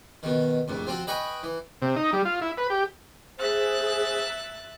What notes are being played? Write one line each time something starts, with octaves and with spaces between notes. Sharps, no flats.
B2 D#3
A#1 F2 A2
F3 C4 F#4
B4 D#5 G5 G#5 B5 C#6
E3
C3
D#4
G3
F4
E4
B4
G4
G#4 C5 E5 F#6 A6